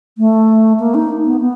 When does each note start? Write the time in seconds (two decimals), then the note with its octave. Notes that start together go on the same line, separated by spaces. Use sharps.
0.18 A3
0.79 A#3
0.95 D#4
1.26 B3
1.40 B3